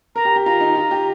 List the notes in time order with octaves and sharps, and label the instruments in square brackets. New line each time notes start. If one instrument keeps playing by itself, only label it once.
[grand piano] A#4 [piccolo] A#5
[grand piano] G4
G4
[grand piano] F4 [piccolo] A#5
[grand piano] D#4
F4
G4